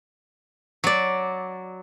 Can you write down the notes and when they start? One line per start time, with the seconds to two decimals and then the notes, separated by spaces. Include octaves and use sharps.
0.84 F#3 D5